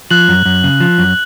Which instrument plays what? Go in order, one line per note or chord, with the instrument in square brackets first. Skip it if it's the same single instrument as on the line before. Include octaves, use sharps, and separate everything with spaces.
[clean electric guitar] F3 [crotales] F#6 F#7
[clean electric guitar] F#2
F#2
C#3
F3
F#2